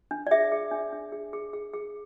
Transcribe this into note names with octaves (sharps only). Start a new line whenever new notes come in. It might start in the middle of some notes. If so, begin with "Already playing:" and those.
D4
D5
G#4 E5
G#4
D4
D4
G#4
G#4
G#4
G#4